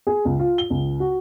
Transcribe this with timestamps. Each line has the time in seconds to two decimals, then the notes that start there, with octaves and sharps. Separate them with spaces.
0.07 G#4
0.25 C#2
0.39 F4
0.58 G7
0.70 C#2
1.00 F#4